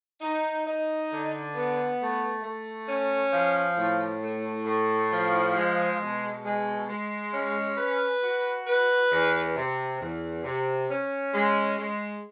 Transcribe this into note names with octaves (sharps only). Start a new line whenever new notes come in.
D#4
D#4
D3
B3
A3
A3
C#4
F3
A2
A3
A2
F3
G#3
B2
G#3
G#3
C#4
B4
F#4
B4
E2
C3
E2
C3
C#4
G#3
G#3